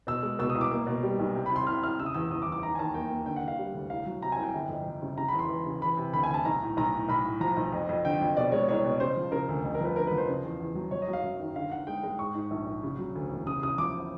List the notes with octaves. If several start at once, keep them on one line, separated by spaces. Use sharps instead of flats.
B2 E6
G#3
B2 E6
D#6
C2
D6
A#3
B2
G3
B1
C3
B5
C3
C6
C2 F6
C2 F6
C#3 E6
D#6
E2 E6
E2 D#6
D6
E2
D6
D#3 A#5
G#5
D#2 A5
A#3 G5
A#3
D3 G5
F#5
D3
F5
G3
D2
C2 F5
F#3
C3 A#5
G#5
C2
G5
G1
F2
F2
C#3
C#3 A#5
B5
E2
C6
E3
C#3
E3 B5
C3
D2 B5
G#5
D2 A5
B1 A#5
A2
B1 A#5
A2
B1 B5
A2
F3 A#5
B1
F2
F2
D3 G5
F2
B2 D5
G#3 C#5
C2 C#5
B2
C#3 C5
F3
C#3 A#4
D2
F2
A#4
F3 B4
D3 A#4
B4
F3
C5
C#3
E2
E2
F#3
F#3 C#5
D#5
F#3
F5
F#2
D#3
D3 F5
D3 F#5
G#3 G5
G#3
G#2 C#6
G#2
A#1
A#1
C#3
F#3
D2
E1
C#3 D#6
C#3 D#6
F3 D6